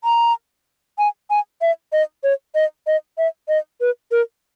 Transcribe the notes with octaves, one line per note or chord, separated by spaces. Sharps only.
A#5
G#5
G#5
E5
D#5
C#5
D#5
D#5
E5
D#5
B4
A#4